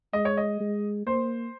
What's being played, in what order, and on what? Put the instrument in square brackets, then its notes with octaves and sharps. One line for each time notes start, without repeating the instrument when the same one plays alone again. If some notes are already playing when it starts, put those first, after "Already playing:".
[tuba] G#3 [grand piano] D#5
[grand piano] C#5
D#5
[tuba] G#3
[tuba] A#3 [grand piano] C5